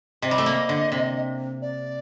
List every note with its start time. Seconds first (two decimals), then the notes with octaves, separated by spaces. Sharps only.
0.22 C3 D#5
0.31 G3
0.38 A3
0.46 A#3
0.69 D3
0.92 C3
1.62 D5